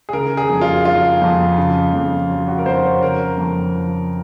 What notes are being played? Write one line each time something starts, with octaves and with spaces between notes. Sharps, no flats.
G#4
C#3 A#4
G#4
F2
F4
F#3 F4
F2
C#3
F2
F#3
F#4
A#4
F2 C5
C#5
C#3 A#4
F2
F3